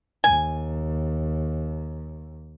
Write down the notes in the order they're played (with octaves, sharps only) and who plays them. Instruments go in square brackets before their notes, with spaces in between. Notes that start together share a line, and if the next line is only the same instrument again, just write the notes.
[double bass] D#2 [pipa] G#5